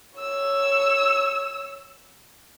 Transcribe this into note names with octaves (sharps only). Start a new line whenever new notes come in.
C#5 E6